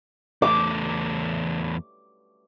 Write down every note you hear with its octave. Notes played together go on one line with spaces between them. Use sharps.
E2 A3 D6